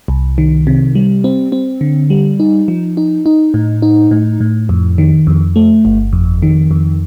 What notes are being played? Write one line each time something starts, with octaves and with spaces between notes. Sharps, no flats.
C2
D#3
C3
G3
C4
C4
D3
G3
D#4
F3
D#4
D#4
A2
D#4
A2
A2
F2
D#3
F2
A3
G1
F2
D#3
F2